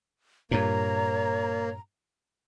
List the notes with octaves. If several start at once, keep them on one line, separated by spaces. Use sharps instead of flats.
G2 A#2 A#3 C#5 A#5